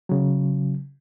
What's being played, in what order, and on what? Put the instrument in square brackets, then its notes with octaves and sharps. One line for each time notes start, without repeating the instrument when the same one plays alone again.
[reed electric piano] C#3 F#3